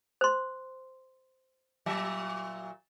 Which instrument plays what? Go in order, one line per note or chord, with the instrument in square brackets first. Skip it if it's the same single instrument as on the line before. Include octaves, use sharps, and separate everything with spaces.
[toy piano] C5 C6
[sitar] A#2 F#3 E5